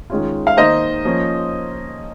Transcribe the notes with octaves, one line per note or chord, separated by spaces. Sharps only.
D#3 G#3 C#4 F4
F5
D#3 A#3 D#4 C5 D#5
F3 A#3 C#4